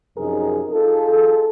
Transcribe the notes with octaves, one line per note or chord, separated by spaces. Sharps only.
F#2 C3 F3 D#4 G#4 A#4
D#4 F4 G#4 A4